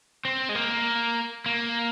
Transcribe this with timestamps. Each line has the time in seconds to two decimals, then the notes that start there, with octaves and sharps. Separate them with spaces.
0.25 C4
0.49 G#3
0.55 A#3
1.46 A#3